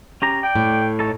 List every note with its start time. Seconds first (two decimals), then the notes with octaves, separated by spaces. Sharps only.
0.22 C#4 G4 A#5
0.43 D5 G5
0.55 A2
0.99 D#4 A4 C#5